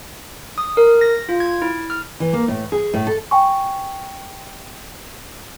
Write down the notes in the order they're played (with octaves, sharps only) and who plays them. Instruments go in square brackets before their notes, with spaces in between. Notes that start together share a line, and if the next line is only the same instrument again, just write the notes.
[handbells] D#6
A#4
A#6
F4
G#6
E4
F6
[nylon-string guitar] E3
A#3
A2
G#4
A2
A4
[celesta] G5 G#5 C#6